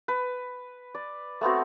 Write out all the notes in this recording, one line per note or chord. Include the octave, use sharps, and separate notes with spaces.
B4
D5
A3 B3 C4 F#4